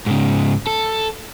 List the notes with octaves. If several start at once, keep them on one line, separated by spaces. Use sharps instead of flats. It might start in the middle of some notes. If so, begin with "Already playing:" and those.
G#2 C#3
A4